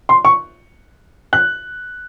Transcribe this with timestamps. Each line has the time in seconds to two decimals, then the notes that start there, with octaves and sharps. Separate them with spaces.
0.09 C6
0.25 C#6
1.33 F#6